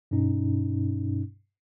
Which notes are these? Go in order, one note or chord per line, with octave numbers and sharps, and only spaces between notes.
G2 B2 C#4 D#4